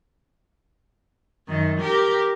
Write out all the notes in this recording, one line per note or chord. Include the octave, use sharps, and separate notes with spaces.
F#2 D#3
G4 A#4